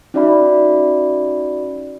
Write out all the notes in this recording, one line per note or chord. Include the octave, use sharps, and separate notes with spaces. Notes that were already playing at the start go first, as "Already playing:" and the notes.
C#4 D#4 F#4 D5 E5 B5